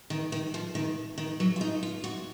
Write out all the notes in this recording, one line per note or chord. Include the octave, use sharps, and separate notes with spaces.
D#3
D#3
F3
D#3
D#3
F#3
F4
D#4
F4
F#4